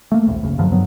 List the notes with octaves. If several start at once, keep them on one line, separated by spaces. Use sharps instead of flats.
A3 A#3
D#1 A#1
F#1 C#2
G2 D3 F3 F#3
G2 F#3 B3